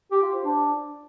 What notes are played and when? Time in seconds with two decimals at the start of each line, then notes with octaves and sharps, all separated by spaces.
0.11 G4
0.22 F4
0.34 C5
0.45 D4